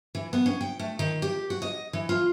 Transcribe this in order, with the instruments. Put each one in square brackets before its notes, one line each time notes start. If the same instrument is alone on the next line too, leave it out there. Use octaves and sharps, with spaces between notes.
[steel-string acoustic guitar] E3
B3
C#4
G5
A3
D#3
G4
F#4
D#5
E3
F4